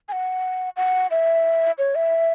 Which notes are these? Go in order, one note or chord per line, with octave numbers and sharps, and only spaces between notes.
G#5
F#5
F#5
E5
C#5
E5